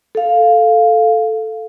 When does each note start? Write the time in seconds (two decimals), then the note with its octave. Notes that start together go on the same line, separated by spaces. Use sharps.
0.15 A4 F5